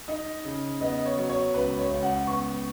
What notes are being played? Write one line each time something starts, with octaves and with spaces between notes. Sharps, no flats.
D#4 D#5
C#3
B3 D#5
C#5
F#3
C#5
C#2 B4
C#5
C#2
F#5
B3 C#6